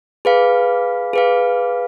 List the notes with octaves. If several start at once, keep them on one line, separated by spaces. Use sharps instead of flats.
G#4 B4 F5
G#4 B4 F5